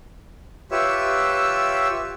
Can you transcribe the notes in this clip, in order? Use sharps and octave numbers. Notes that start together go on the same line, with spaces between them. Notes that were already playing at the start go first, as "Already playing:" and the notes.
F4 G4 B4 C#5 E5 E6